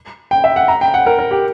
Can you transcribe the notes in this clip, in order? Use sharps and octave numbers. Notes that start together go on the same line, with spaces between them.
G5
E5
F#5
A#5
G5
F#5
A#4
A#4
G4